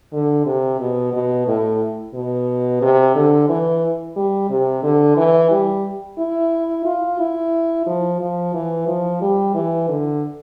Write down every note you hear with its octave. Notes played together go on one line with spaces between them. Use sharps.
D3
C3
B2
B2
A2
B2
C3
D3
E3
G3
C3
D3
E3
G3
E4
F4
E4
F3
F3
E3
F3
G3
E3
D3